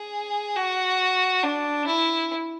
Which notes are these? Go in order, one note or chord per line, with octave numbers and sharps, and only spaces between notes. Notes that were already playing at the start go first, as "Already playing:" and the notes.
Already playing: G#4
F#4
D4
E4